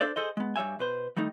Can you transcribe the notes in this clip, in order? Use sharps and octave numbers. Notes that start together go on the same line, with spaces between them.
D4 A4 C5 D5
G#4 A4 C5 D#5
G#3 B3
G2 G3 C#5 E5 G#5
B2 B4 C5
D#3 G3 A3 D#4